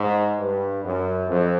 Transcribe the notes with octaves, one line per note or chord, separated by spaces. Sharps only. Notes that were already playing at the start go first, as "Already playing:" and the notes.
Already playing: G#2
G2
F#2
F2